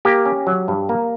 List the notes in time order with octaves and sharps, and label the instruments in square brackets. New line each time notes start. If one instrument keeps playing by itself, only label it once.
[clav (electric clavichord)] A#3 G4
C#4
F#3
G2
A#3